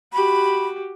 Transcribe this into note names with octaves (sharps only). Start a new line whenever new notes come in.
F#4 G4 B5